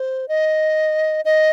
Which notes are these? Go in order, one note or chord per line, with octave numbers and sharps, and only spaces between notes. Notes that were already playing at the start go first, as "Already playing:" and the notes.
Already playing: C5
D#5
D#5